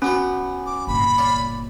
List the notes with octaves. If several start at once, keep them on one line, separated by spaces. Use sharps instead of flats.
B3 C#4 F#4 G5
D6
G1 A#2 B5
C#5 D5 F5